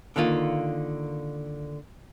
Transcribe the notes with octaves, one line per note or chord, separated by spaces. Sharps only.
D3 D#3 A#3 F4